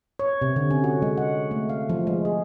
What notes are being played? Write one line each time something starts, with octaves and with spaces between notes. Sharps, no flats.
C#5
C3
D3
C#4
F#4
G#3
F#5
A3
F5
F3
G#3
G#4